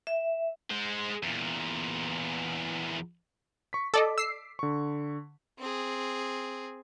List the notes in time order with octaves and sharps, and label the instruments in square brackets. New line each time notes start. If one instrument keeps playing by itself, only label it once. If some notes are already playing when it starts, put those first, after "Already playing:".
[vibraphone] E5
[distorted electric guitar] G#3 C5
E2 A#2
[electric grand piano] C#6 B6
[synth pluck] A4 D5 D#5 [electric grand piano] D6
[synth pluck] E6 C7
[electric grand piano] D3 C#6
[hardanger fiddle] C4 G#4